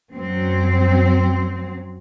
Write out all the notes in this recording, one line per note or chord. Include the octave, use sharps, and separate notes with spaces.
F#2 F#3 C4